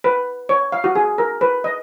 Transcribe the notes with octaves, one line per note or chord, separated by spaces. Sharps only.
B4
C#5
F5
F#4
G#4
A#4
B4
D#5